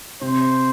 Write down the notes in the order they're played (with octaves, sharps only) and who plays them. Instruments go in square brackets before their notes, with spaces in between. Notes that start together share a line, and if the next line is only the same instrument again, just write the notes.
[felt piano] C3 [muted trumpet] C5